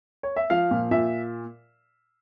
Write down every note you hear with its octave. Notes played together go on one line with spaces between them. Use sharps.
C#5
E5
F3 F5
A#2
A#2 E5